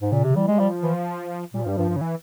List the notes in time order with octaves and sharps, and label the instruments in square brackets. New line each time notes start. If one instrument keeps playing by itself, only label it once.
[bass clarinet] G#2
[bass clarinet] A#2 [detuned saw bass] C#3
[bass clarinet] C3
[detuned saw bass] C#3
[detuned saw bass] E3 [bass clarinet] G3
[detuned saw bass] G3 [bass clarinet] G#3
[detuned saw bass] F3 [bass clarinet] G3
[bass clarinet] E3
[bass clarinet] A#2 [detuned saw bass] G3
[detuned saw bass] F3
[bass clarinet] G2 [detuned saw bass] G3
[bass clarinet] G2 [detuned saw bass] F3
[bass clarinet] G2
[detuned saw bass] C#3
E3